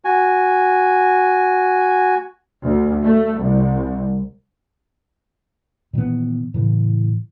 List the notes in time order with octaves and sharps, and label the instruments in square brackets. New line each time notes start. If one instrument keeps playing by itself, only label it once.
[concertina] F#4 G#5
[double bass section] D2
A3
C2
[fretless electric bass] A#2 D#3 E3 B3
A2 C#3 E3